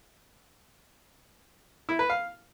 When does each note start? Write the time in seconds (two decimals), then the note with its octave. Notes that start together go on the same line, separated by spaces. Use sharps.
1.89 E4
1.99 B4
2.10 F5